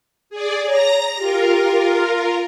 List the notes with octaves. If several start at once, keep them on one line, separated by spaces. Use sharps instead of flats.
G#4 D5
C#5 A#5 A#6
F4 G4 A#4